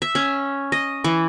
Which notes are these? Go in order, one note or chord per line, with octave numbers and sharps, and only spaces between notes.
E5
C#4
D#5
E3